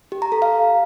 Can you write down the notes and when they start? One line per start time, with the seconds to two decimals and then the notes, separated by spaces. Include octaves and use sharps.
0.12 G4
0.22 A#5
0.32 A4
0.42 F5